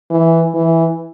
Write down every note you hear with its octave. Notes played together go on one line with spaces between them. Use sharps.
E3
E3